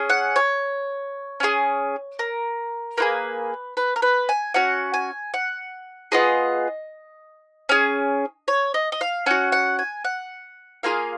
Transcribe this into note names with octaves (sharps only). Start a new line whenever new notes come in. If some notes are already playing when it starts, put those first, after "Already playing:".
Already playing: C#4 G#4
F#5
C#5
C#4 F4 G#4
A#4
A#3 F4 G#4 B4
B4
A#4
B4
G#5
C#4 F#4 F#5
G#5
F#5
B3 F4 G#4 D#5
C#4 G#4
C#5
D#5
D#5
F5
C#4 F#4 F#5
F#5
G#5
F#5
A#3 F4 G#4 F5